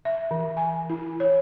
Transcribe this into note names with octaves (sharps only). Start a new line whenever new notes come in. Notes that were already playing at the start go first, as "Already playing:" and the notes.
E5
E3
G#5
E4
C#5